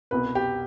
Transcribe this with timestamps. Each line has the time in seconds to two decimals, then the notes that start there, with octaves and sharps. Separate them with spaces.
0.11 C2 B2 B4
0.35 G4